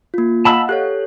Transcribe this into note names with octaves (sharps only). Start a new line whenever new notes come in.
A#3 F4
D#5 F5 F#5 A5 B5 E6
G4 A4 C#5 F#6